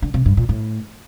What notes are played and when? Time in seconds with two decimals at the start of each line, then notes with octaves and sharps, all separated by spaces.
0.02 D3
0.14 C3
0.26 G2
0.37 A#2
0.49 A2